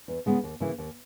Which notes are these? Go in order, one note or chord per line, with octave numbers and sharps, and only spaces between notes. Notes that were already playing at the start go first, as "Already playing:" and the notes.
E2
C#3 G#3 B3
D#2
C#3 E3 A#3 E4
D#2